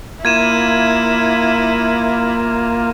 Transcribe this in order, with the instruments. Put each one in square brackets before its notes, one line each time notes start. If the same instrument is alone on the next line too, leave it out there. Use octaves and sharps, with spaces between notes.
[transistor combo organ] A#3 F4 [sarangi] E4 [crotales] G#6 D#7 E7